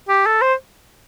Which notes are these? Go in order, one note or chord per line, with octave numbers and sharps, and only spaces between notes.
G4
A4
C5